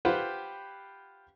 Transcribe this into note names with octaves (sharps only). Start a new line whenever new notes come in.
F4 G4 B4 C5 F#5 G5